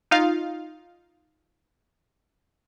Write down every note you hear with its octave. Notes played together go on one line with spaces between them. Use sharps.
D#4 F4 F5